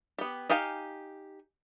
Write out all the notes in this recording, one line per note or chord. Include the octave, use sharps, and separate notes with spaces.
B3 G4
D#4 G4 F5 G#5